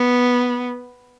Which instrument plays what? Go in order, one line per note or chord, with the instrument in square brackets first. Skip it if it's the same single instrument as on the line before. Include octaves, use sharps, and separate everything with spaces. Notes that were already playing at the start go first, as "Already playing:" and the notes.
Already playing: [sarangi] B3